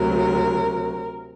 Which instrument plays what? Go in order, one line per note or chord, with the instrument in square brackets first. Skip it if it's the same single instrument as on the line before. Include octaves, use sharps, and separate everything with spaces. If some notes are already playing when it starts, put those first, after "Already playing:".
Already playing: [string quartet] D2 C3 F#3 A#4